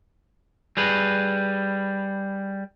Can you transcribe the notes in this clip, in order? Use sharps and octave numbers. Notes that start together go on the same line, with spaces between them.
G3 G#4 B4